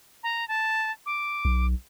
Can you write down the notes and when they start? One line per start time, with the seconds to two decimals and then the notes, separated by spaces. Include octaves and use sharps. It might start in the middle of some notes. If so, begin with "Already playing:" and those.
0.23 A#5
0.48 A5
1.06 D6
1.45 B1